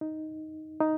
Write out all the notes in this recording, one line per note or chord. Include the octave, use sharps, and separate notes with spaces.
D#4
D#4